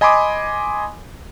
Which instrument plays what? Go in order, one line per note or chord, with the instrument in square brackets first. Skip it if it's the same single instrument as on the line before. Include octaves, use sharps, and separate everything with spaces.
[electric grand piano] D#5 G#5 B5 C6 D6 D#6